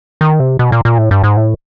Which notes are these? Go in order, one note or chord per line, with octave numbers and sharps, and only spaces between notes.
D#3
C3
B2
A#2
A#2
A2
G2
G#2
A2